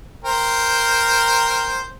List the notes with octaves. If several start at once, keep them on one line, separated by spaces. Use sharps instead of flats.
A#4 C5 G5